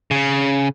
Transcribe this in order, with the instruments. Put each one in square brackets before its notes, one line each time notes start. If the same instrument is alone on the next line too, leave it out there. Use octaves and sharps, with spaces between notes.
[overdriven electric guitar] C#3